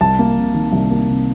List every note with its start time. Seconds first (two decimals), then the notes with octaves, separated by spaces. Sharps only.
0.01 C2 A5
0.19 A#3
0.37 C3
0.54 D#3
0.72 C2
0.90 A#3
1.09 C3